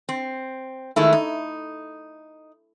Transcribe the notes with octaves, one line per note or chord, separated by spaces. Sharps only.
C4
D#3 G#3 A3 E4
D#4